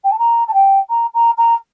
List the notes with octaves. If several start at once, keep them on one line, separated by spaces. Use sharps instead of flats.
G5
A5
A#5
A5
G5
A#5
A#5
A#5